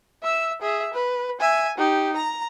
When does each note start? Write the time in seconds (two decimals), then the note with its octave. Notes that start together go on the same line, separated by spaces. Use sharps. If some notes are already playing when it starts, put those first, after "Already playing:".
0.23 E5 E6
0.62 G#4 E5
0.94 B4
1.41 E5 G#5
1.78 D#4 G4
2.16 A#5